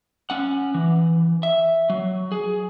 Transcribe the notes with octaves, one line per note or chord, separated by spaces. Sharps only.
C#4 F#5
E3
E5
F#3
G#4